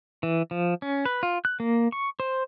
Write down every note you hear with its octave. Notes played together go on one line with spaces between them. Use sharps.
E3
F3
C#4
B4
F4
F#6
A#3
C#6
C5